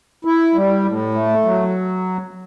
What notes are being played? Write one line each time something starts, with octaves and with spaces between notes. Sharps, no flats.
E4
G3
A2
A3
F#3